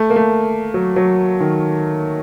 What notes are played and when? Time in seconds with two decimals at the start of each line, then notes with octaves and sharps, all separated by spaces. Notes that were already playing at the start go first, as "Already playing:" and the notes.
Already playing: A3
0.10 A#3
0.16 A3
0.74 F#3
0.96 F#3
1.40 D#3